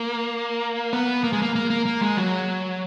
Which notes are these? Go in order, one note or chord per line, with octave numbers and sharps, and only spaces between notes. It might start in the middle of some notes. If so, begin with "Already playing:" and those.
Already playing: A#3
B3
A#3
G#3
A#3
A#3
A#3
A#3
G#3
F#3